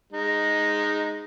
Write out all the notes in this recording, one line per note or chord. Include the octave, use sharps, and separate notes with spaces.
G#3 D#4